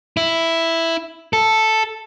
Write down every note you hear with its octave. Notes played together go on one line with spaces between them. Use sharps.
E4
A4